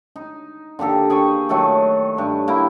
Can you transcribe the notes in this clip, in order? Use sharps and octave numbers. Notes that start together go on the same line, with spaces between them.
D#4
D3 A#3 G4 A4
G#4 G5 G#5 C#6
D#3 F#3 A3 A4
G2
A#3 E4 G5